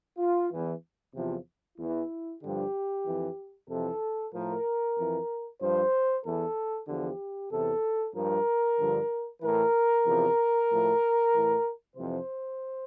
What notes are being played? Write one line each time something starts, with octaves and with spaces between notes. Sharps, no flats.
F4
E2 E3
E2 C3 F3
E2 E3 E4
G2 D3 F3 G4
F2 E3
F2 C3 E3 A4
A2 F3 A#4
F2 E3
G2 F3 C5
E2 E3 A4
E2 D3 F3 G4
E2 C3 E3 A4
G2 F3 A#4
G2 D3 F3
A2 E3 A#4
E2 C3 F3
A2 F3
A2 E3
F2 C3 E3 C5